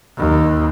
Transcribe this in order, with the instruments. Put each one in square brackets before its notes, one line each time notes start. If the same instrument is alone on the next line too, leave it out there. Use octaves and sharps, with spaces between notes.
[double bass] D#2